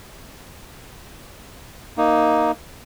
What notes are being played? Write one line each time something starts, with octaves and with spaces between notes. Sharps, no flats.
A#3 D#4